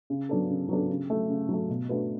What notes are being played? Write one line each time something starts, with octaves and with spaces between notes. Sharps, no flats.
C#3
F#3 B3 D4 A4
C#3
F#3 B3 D4 A4
C#3
F#3 A3
C#3
F#3 A3
B2
A3 D4 F#4 B4